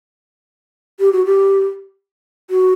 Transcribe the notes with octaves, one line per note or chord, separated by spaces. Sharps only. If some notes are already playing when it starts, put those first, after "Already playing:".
G4
F#4
G4
F#4